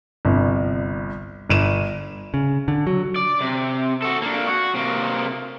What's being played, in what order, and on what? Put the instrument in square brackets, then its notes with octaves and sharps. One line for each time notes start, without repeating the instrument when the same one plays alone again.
[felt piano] G1 C2
G1 D#7 E7
[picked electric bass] C#3
D3
F#3
[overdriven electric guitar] D5
C3
F#4 A4
A#3 D4
F#4
C3 A#3